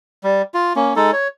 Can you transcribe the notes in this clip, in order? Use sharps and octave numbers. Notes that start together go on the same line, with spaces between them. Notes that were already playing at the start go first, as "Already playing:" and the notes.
G3
F4
A#3 C#4
G#3 D#4 A4
C#5